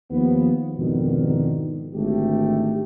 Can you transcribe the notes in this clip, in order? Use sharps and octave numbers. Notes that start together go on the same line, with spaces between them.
D#2 F3 B3
F2 G#2 B2 D3 D#3
G#1 D3 G#3 A3 G4